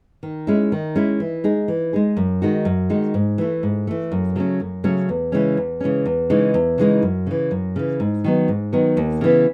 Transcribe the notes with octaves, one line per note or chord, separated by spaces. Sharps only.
D#3
G#3 C#4 E4
D#3
G#3 C#4 E4
E3
G#3 D#4 G#4
E3
G#3 D#4 G#4
F#2
D#3 G#3 D#4 F#4
F#2
D#3 G#3 D#4 F#4
G#2
E3 A3
G#2
E3 A3
F#2
C#3 F#3 A3 C#4
F#2
C#3 F#3 A3 C#4
E2
C#3 E3 G#3 C#4
E2
C#3 E3 G#3 C#4
E2
C#3 E3 G#3 D#4
E2
C#3 E3 G#3 D#4
F#2
C#3 E3
F#2
C#3 E3
G#2
D#3 F#3 B3
G#2
D#3 F#3 B3
D#2
C#3 E3 B3